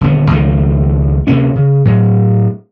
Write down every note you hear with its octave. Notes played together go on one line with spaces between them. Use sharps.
D#1 D3 B3
C#2 D#3 F3 A3
D2 C3 A#3 C#4
C#3
A2 F#3